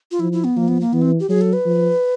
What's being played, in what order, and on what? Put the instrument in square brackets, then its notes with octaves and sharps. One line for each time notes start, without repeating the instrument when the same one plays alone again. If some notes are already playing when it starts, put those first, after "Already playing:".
[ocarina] F4
[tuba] F3 [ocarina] E4
[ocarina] E4
B3
[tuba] F3 [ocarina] A#3
[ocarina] B3
A#3
[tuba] E3 [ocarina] B3
[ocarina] C4
G4
[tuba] F#3 [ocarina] G#4
[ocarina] A4
B4
[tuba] F3